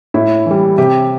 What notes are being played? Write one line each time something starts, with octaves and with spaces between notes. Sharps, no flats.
A2 E4
E3 G3
C3 G4